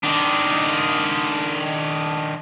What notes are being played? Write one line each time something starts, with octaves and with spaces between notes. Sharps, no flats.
D#3 D4